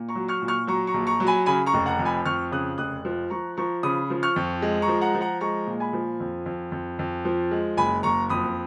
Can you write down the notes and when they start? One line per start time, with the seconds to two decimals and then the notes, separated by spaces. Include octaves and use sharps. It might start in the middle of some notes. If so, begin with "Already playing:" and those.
Already playing: A#2
0.09 A#5 C#6
0.15 F#3
0.28 C#6 F6
0.42 A#2
0.48 C#6 F6
0.67 F#3 A#5 C#6
0.87 A#5 C#6
0.94 A#1
1.07 A#5 C#6
1.20 F#3
1.27 G#5 B5
1.46 C#3 G#5 B5
1.66 A#5 C#6
1.74 F1
1.86 F#5 A#5
1.99 F2
2.05 G#5 B5
2.25 F2 C#6 F6
2.51 C#3 D#6 F#6
2.78 F1 D#6 F#6
3.05 F3
3.30 F3 A#5 C#6
3.57 F3 A#5 C#6
3.83 C#3 B5 D#6
4.10 F3
4.23 C#6 F6
4.36 F2
4.62 G#3
4.82 A#5 C#6
4.88 F3
5.01 F#5 A#5
5.14 F3
5.21 F#5 A#5
5.41 G#3 A#5 C#6
5.67 A#2
5.80 G#5 B5
5.93 F3
6.20 F2
6.46 F2
6.72 F2
6.99 F2
7.25 F3
7.51 G#3
7.77 F#1 G#5 B5
8.03 F#1 A#5 C#6
8.29 F2 B5 D#6